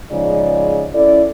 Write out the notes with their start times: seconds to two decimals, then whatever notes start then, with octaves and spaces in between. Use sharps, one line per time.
0.11 G#2 C#3 F3 D#4 D5
0.94 C#4 E4 A4 D5